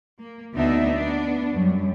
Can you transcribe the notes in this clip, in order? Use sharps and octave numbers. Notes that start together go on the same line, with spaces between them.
A#3
D2 B3 D4 D#4 E5
B3 D4
F#2 G3